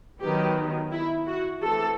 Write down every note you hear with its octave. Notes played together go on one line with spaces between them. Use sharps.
D#3 F#3 B3 G4
E4
F#4
E3 A3 C4 A4